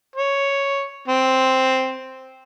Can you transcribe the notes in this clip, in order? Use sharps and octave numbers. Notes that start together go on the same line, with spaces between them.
C#5
C4